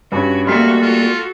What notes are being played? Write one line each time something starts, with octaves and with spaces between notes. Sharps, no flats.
G2 C#4 F#4
G3 A3 A#3 F#4 A4 F5 C6 B6
F4